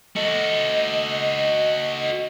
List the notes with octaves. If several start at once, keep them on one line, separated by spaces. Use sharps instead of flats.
F#4 A4 D#5